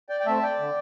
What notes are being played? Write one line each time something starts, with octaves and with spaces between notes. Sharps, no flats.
D5 G5
G5
A3 C4 E5 A5
D5 G5
D3